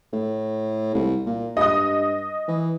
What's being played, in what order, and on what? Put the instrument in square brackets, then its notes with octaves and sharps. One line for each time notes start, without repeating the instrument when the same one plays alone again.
[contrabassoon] A2
C2
A#2
[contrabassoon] G2 [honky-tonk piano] D#5 D#6
[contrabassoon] E3